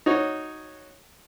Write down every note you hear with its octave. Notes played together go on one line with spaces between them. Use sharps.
D#4 F#4 C#5